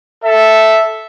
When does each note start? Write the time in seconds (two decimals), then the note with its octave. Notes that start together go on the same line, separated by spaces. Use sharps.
0.24 A4 E5